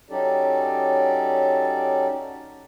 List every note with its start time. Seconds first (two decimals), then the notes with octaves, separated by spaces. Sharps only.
0.10 F#3 C#4 D#4 G4 A4 D5